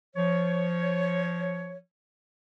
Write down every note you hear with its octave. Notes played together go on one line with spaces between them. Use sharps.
F3 C#5